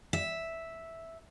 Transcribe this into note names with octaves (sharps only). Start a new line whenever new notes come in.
E5